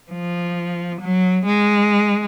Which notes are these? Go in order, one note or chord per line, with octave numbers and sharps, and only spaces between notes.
F3
F#3
G#3